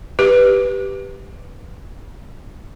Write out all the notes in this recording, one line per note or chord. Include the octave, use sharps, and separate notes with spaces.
G4 B4